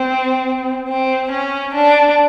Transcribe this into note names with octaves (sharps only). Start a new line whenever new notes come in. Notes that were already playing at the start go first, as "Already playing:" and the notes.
Already playing: C4
C4
C#4
D4